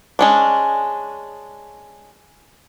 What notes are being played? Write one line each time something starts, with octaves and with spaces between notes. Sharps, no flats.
G#3 C#4 D4